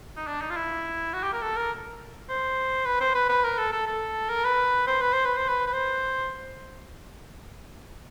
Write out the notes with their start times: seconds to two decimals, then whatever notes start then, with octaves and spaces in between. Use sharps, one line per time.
0.17 D#4
0.27 D4
0.42 D#4
0.50 F4
0.56 E4
1.13 F#4
1.23 G4
1.33 A#4
1.42 A4
1.57 A#4
2.29 C5
2.86 B4
3.00 C5
3.14 B4
3.29 B4
3.44 A#4
3.58 A4
3.72 A4
3.87 A4
4.29 A#4
4.44 B4
4.87 C5
5.01 B4
5.13 C5
5.25 B4
5.37 C5
5.48 B4
5.67 B4
5.73 C5